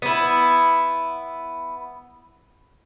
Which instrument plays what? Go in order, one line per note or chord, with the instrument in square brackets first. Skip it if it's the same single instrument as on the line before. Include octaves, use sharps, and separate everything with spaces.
[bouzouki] B3 E4